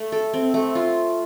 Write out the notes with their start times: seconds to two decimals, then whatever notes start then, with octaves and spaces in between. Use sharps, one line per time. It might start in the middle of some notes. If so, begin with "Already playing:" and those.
Already playing: A3
0.12 A4
0.33 C4
0.54 A3
0.75 F4